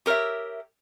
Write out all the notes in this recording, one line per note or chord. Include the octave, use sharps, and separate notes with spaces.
G4 A#4 C5 C#5 E5